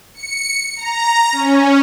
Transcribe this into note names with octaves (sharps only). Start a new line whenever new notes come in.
C#7
A#5
C#4